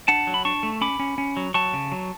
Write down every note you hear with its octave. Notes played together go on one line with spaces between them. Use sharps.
D4 F#5 A5
F#3
B5
D4 A5 C#6
A3
C#4 B5 D6
C#4
C#4
F#3
F#3 A5 C#6
C#3
F#3